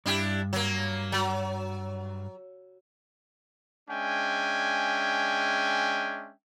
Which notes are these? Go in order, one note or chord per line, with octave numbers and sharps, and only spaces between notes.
G2 D4 E4 G4
F#3 A#3
F#3
G#3 C#4 D4 E5 G5 G#5